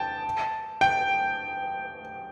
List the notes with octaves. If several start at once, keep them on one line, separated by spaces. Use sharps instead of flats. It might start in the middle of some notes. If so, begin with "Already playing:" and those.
Already playing: G5 A5
G5